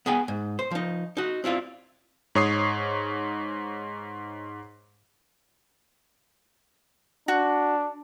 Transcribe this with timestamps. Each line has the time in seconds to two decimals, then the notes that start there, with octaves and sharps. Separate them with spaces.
0.06 B3 G#4 G5 G#5
0.28 G#2
0.59 C5
0.71 F3 D#4
1.17 D#4 F#4
1.44 C4 E4 F4 D5
2.35 G#2 C#5 D#6 C7
7.28 D4 F#4